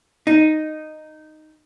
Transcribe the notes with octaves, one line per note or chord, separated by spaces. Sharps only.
D#4